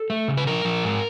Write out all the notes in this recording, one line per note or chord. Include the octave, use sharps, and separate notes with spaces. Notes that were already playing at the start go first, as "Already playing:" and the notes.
Already playing: A4
A3
C#3
B4
F3 A#4
F3
G#2